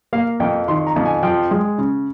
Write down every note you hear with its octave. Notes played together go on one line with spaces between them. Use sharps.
A#3 F5
F2 G5
D#3 C6
A#5
F2
G#5
F3 G5
G#3
C#3